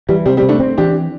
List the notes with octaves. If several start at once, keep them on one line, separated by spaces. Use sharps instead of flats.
E3 G3
C3 G3 C4
G3 C4
C3
A3 D4
C4
E3 D4 G4